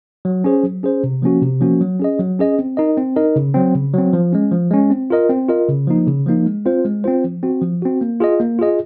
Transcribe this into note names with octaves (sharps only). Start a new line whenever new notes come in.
F#3
C#4 G#4 C5
F#3
C#4 G#4 C5
C3
F3 A#3 C#4 F#4
C3
F3 A#3 C#4 F#4
F#3
C#4 G#4 D#5
F#3
C#4 G#4 D#5
C4
D#4 A#4 D#5
C4
D#4 A#4 D#5
C#3
F#3 C4
C#3
F#3 C4
F3
G#3 C#4
F3
G#3 C#4
C4
F4 A#4 D#5
C4
F4 A#4 D#5
C#3
F3 A#3 D#4
C#3
F3 A#3 D#4
G#3
C4 F4 C5
G#3
C4 F4 C5
F3
C4 F#4
F3
C4 F#4
A#3
F4 G#4 D#5
A#3
F4 G#4 D#5